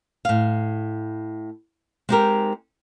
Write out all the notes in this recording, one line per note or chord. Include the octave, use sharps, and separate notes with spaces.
A2 F5
G#3 C4 D#4 F#4 G4 A#4